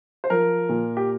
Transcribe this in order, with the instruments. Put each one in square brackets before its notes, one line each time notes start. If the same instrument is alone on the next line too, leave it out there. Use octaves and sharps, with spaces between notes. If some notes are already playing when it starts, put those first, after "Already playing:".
[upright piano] C5
F3 A#4
A#2
G4